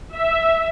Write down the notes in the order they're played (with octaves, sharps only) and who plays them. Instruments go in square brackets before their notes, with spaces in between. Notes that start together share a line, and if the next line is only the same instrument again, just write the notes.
[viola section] E5